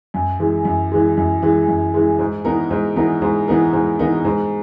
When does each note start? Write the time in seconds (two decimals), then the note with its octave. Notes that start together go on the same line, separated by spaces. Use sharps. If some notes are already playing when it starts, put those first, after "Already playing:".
0.14 F#2
0.39 E3 G#3
0.65 F#2
0.92 E3 G#3
1.17 F#2
1.42 E3 G#3
1.68 F#2
1.94 E3 G#3
2.19 G#2
2.45 E3 B3 D#4 A#4
2.71 G#2
2.96 E3 B3 D#4 A#4
3.22 G#2
3.48 E3 B3 D#4 A#4
3.73 G#2
3.99 E3 B3 D#4 A#4
4.25 G#2